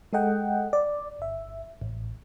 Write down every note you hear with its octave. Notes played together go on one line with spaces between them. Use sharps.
G#3 A4 D#5 F#5 G5
D5
G1 E5
A1